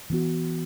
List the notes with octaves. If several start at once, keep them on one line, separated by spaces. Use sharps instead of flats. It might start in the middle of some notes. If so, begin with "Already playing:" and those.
E3 B3 F#4